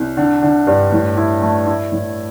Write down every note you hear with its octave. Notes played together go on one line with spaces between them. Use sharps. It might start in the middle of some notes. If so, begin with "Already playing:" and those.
Already playing: C2
D3
D3
G2
A2
E4
A3
E4
A2